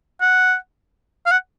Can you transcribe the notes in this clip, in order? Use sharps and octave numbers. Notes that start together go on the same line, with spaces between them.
F#5
F5
F#5